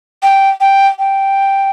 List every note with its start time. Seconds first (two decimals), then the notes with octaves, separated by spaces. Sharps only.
0.23 G5
0.61 G5
0.99 G5